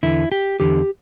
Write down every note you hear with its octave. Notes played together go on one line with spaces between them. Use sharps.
E2 D3 E4
G4
E2 D3 G4